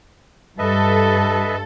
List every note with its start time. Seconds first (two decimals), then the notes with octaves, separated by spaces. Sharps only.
0.59 G2 A4 B4 D#5 E5